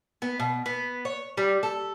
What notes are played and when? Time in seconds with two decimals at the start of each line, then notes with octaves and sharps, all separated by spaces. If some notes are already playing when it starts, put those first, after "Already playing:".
0.22 B3
0.40 B2
0.66 B3
1.05 C#5
1.37 G3
1.63 A4